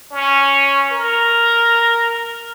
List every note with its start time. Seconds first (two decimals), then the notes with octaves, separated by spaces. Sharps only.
0.12 C#4
0.92 A#4